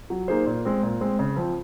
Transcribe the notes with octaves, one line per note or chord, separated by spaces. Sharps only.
F#3
A#3 D#4 G#4 C5
A#2
G#3 C4
A#2
G#3 C4
C#3
F3 C4